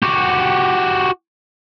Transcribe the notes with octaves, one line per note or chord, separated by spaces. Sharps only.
F#4 G4